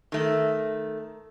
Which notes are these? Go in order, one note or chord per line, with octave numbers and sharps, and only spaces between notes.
D#3 A3